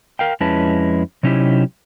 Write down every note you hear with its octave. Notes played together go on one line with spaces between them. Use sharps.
A#4 F5 G5
F2 G#3 C#4 E4 B4 A5
C3 F#3 C#4 D#4 E4 G4